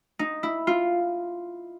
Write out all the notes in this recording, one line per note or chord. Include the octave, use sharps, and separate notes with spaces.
D#4
E4
F4